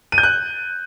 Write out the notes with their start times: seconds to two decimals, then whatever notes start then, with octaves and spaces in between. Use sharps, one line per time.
0.12 D#7
0.18 G6
0.23 F#6